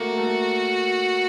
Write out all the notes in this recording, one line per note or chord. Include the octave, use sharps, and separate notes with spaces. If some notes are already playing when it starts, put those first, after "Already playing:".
Already playing: A3 A#3 F#4
A3